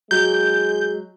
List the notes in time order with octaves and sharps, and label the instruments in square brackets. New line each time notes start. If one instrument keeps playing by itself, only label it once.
[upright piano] F#3 [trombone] G#3 [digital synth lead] G6